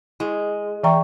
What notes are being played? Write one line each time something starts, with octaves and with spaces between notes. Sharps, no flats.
G#3 E4
E3 E5 G5 A#5 C#6